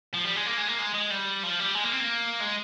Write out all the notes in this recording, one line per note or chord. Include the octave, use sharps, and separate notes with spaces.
F3
G3
G#3
A#3
G#3
A#3
G#3
G#3
G3
F3
G3
G#3
A#3
C4
A#3
G#3